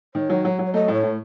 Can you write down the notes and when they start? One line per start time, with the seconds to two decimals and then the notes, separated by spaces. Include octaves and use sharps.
0.15 D#3 C#5
0.30 F#3
0.45 F#3
0.59 F#3
0.66 C#5
0.74 A3 D#5
0.88 A2
0.94 C#5
1.03 A2